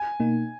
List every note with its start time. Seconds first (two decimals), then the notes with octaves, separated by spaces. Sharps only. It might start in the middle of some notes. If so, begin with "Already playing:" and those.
Already playing: G#5
0.20 B2 A#3 D#4